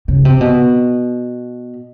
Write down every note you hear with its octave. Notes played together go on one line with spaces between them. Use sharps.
C#3
C3
B2